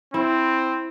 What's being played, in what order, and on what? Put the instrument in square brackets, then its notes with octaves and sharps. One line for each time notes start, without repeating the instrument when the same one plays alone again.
[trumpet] C4 [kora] E4